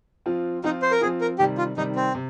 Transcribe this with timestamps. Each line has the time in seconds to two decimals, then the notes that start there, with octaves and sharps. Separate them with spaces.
0.26 F3 C4 F4
0.64 F3 C4 D#4 F4
0.82 C5
0.91 A#4
1.01 F3 C4 F4 G#4
1.21 A#4
1.39 C3 D#3 G3 G4
1.58 F4
1.77 C3 D#3 G3 D#4
1.96 C4
2.15 C3